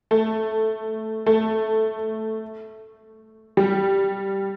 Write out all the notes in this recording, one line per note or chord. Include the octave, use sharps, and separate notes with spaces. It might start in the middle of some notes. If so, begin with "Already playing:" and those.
A3
A3
G3